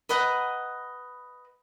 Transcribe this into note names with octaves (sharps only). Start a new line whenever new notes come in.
B4 D#5 F#5 A#5